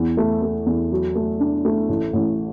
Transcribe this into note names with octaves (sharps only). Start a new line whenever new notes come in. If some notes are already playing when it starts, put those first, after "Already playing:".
Already playing: E2
A3
A3
E2
F#3
A3
D4
A3
A1
A1